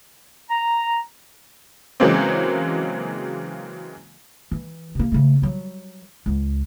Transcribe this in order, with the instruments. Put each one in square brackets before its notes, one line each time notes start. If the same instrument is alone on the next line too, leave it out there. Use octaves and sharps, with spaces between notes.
[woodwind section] A#5
[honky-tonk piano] C#3 E3 F#3 G#3 A#3 C4
[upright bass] E3
C3 A#3
C#3 A3
F#3 G3
C#2